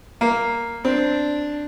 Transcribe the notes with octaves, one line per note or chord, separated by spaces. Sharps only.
A#3
C4 D4